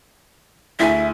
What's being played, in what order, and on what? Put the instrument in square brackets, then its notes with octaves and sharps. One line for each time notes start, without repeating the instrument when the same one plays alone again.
[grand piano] D2 G#4 G#5 [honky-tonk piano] E4 [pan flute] E5